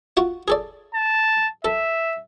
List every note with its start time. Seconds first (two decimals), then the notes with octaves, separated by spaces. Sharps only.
0.17 F4 F#4 F#5
0.48 G#4 A4 D5
0.94 A5
1.65 A4 E5